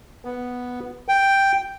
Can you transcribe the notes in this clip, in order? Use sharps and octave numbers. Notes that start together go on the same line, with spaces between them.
B3
G5